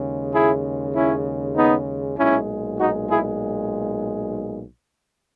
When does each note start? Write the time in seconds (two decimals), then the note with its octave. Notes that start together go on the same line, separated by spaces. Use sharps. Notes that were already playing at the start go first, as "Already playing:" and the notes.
Already playing: D#2 C#3 G#3
0.33 E4 G#4
0.95 C#4 E4
1.56 B3 D#4
2.18 B1 A#2 G#3 C#4 E4
2.80 D#4 F#4
3.11 E4 G#4